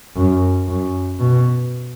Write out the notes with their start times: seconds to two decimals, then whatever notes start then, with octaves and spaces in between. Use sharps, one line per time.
0.16 F#2
0.67 F#2
1.20 B2